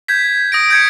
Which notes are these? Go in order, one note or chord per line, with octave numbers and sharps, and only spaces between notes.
G6 G#6 B6
D#6 A#6 D7
G6 G#6 C#7